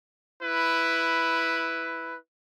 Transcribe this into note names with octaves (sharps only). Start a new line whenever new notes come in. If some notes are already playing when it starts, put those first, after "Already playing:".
E4 B4